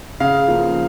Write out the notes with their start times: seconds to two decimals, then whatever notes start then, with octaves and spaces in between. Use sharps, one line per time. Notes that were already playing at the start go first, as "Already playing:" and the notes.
0.20 C#3 F5
0.48 F3 A#3